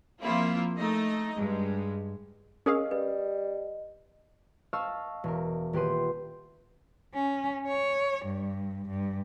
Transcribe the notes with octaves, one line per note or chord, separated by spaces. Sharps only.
F3 A#3 C4 E4 F4
A3 D#4 D#5
G2 G#3
C#4 G#4 A#4 D#5 F5 D#6
G3 B4
D#5 F5 A5 C#6 E6 F6
E1 A#4
D#1 G4 B4 C6 D#7
C#4
C#5
G2
G2